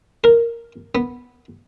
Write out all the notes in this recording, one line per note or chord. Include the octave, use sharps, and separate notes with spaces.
A#4
B3